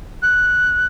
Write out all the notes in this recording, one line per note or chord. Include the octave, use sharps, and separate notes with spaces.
F#6